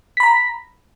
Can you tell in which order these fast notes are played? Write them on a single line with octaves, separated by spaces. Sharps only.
B6 B5 A#5